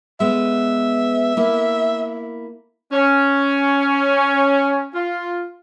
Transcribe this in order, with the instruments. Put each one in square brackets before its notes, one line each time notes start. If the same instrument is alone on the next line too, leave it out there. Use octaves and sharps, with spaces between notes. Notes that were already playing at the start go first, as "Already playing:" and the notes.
[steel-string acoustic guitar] G#3 B3 [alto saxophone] E5
[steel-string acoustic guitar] A#3 E4
[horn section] C#4
F4